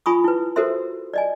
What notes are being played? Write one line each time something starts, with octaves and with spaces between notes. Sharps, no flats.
F4 G#5 B5 C#6 D#6
E4 B4
F#4 A4 A#4 C5 E5 C6
D5 D#5 G#5